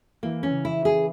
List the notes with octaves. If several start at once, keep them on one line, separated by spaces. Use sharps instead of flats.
E3 A#3
C#4
C#3
E4
E3
G#4